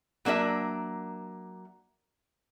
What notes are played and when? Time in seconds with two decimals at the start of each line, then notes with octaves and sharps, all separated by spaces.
0.25 F#3 A#3 D4 A#4 E5